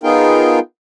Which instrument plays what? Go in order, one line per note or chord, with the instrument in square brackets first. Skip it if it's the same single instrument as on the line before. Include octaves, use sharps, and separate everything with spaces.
[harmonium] B3 D#4 F4 G#4 A#4 G5